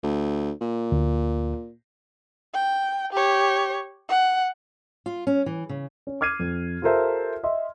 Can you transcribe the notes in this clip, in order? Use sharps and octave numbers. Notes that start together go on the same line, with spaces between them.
D2
A#2
D2
G5
G4 C#5
F#5
F4
C#4
E3
C#3
C#4
D6 F6 G#6 C7 D#7
F2
F4 G4 A4 A#4 C5 E5
D#5 E5 C6